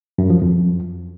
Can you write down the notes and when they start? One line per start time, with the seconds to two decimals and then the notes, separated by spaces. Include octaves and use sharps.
0.18 F#2
0.30 F3
0.42 F2